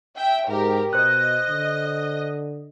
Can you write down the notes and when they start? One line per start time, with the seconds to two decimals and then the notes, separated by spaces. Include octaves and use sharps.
0.16 E5 G5
0.48 G#2 G4 A#4
0.93 B2 C5 D#5 F#6
1.49 D3